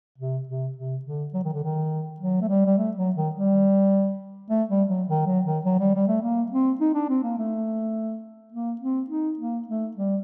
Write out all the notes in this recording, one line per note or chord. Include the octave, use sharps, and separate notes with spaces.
C3
C3
C3
D3
F#3
D#3
D3
D#3
F#3
A3
G3
G3
A3
F#3
D#3
G3
A3
G3
F#3
D#3
F#3
D#3
F#3
G3
G3
A3
A#3
C4
D#4
D4
C4
A#3
A3
A#3
C4
D#4
A#3
A3
G3